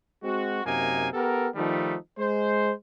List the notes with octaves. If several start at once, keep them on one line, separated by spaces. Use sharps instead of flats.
G#3 C4 F#4
F#2 C3 A#3 D#4 G#5
B3 G4 A4 A#4
D#3 F3 G3 A3 D#4
G#3 C5